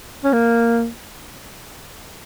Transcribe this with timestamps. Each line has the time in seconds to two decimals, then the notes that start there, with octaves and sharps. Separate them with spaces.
0.24 C#4
0.33 A#3